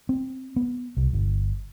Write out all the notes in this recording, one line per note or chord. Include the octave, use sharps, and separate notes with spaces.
C4
B3
C2
G1